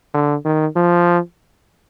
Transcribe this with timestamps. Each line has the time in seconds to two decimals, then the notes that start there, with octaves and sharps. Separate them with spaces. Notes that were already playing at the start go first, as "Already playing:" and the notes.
0.14 D3
0.45 D#3
0.76 F3